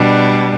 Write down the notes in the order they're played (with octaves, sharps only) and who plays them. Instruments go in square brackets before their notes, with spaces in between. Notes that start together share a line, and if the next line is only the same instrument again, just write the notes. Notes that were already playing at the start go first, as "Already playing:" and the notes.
Already playing: [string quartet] B2 G3 D4